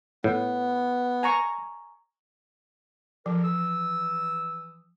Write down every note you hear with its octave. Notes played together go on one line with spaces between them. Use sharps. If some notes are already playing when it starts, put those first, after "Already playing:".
A2 B3
G#5 A#5 C#6
F3 A4 A#4
E3 D#6 E6